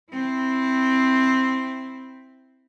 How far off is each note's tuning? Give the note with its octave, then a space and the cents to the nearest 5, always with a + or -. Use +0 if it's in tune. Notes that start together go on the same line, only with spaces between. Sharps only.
C4 +0 E4 -5